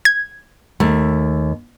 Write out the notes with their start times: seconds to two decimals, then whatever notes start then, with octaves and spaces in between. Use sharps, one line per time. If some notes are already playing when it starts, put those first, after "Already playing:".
0.05 G#6
0.80 D#2 A3